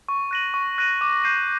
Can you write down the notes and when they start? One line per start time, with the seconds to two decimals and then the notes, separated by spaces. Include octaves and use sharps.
0.09 C#6
0.31 F#6 A#6 D#7 F#7
0.54 C#6
0.78 F#6 A#6 D#7 F#7
1.01 D6
1.24 G6 C7 D#7